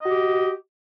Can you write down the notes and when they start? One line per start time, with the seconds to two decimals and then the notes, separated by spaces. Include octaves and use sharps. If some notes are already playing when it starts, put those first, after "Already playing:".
0.01 D#5
0.05 F#4
0.09 G4